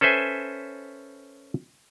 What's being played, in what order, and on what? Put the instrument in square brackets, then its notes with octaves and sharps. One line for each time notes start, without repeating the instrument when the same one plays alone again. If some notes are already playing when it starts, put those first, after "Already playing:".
[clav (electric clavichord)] C#4 A4 B4 C5 E5 G#5